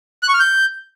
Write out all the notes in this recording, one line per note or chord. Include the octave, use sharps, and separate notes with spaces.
F#6
C#6
F6
G6